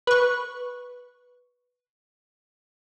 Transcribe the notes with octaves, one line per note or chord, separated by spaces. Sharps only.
B4 C#6